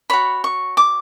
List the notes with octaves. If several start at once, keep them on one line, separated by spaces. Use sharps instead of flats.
F#4 C#5 B5
C#6
D6